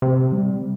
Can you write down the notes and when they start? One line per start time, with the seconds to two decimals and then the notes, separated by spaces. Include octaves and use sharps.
0.02 C3
0.32 G3